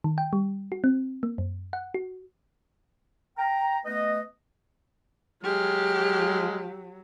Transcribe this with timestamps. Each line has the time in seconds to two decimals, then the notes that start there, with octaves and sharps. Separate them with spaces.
0.04 D#3
0.18 G5
0.33 G3
0.72 F#4
0.84 C4
1.23 A#3
1.38 F#2
1.73 F#5
1.94 F#4
3.38 G5 A#5
3.85 A3 B3 B4 D#5
5.44 F#3 G#3 G4 F6